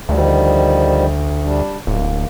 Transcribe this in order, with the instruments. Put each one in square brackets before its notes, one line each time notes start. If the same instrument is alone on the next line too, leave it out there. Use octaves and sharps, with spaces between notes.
[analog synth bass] D2 [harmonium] D#3 F3 G3
[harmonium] G3 D4
[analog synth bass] D1 [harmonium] A#3